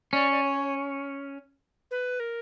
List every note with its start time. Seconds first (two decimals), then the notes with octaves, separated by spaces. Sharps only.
0.13 C#4 D5
0.31 D5
0.43 C#5
1.91 B4
2.20 A#4